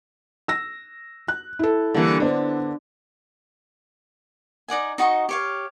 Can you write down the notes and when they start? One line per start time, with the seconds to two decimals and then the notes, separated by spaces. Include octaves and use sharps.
0.48 E6 A#6
1.28 F#6
1.59 E4 A4
1.94 D3 E3 G3 A#3
2.20 D3 B3 C5 D5
4.68 D#4 D5 F#5 G#5
4.98 D#4 F#4 D#5 C#6
5.29 G4 C#5 F5